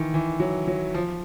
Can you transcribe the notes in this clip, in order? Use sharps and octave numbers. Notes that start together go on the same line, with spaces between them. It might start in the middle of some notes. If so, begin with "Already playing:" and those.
Already playing: D#3 E3
E3
F#3
F#3
F3